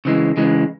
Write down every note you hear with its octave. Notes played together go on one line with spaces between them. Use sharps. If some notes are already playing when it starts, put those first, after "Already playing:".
C#3 E3 G#3
C#3 E3 G#3